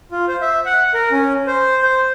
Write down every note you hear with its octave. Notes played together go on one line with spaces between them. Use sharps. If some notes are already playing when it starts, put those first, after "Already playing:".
F4
C5
E5
F#5
A#4
C#4
C5
C5